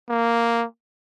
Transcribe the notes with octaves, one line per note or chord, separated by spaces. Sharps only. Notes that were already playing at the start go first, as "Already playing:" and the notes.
A#3